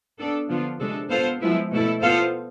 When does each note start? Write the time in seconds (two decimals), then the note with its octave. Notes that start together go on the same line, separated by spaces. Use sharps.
0.18 B3 D4 A4 D5
0.48 D3 F3 B3 D4 F4
0.79 C3 G#3 D4 A4
1.10 B3 F4 A4 C5 F5
1.41 F3 G#3 B3 E4
1.71 B2 A3 E4 A4
2.02 B3 F4 A4 C5 F5